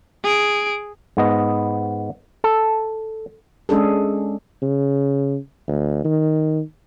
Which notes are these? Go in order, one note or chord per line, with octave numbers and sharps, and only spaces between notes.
G#4 D7
G#2 B3 D#5
A4
G#3 C#4 D4 G#4 A4
C#3
D2
D#3